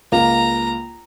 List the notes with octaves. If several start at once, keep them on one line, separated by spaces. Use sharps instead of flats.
C#2 A#3 A#5